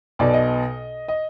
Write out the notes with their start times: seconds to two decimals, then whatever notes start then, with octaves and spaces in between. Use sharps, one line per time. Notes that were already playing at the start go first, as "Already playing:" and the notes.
0.19 B1 B2 D5
0.34 D#5
1.08 D#5